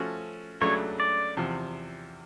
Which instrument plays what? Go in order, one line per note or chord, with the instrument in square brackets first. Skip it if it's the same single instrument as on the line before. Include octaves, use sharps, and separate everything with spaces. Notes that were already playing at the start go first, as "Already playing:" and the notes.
Already playing: [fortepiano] F3 A3 C#4 F#4
[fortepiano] C#2 C#3 F#3 A3 D4 [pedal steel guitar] C#5
[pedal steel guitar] D5
[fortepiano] E2 C3 F3